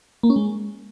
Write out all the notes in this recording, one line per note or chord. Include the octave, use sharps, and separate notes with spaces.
A#3
C#4
G#3